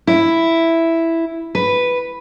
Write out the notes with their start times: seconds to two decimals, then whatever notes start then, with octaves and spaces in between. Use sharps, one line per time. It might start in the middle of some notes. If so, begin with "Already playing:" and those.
0.07 E4
1.55 B4